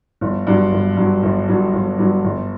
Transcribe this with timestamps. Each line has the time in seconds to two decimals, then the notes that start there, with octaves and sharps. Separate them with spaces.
0.21 G1
0.47 G2 F#3
0.72 G1
0.97 G2 F#3
1.23 G1
1.49 G2 F#3
1.73 G1
1.99 G2 F#3
2.24 G1